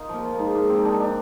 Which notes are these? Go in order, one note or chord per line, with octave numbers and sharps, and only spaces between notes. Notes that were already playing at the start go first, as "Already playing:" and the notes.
Already playing: D#4 F4 A#4
F3 A#3
F3
G#2 A#3
G#2 A#3
F3 C4
D#4
F3 D4
D4